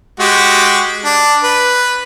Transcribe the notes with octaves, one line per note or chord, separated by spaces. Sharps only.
G#3 F#4 G4
D4
B4